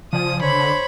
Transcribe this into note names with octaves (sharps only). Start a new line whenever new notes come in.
C#3 F3 D5 G#5 D#6
D3 C5 C#5 B5